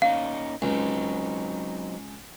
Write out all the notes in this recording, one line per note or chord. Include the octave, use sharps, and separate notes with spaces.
A#3 C#4 D#4 F5
C#2 F#3 C4 D#4